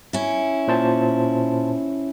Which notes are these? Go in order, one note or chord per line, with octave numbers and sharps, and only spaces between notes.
C#4 E4
A#2 C5 A5